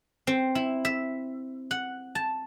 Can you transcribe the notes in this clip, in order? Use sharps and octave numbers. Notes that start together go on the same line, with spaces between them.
C4
E4
E5
F#5
A5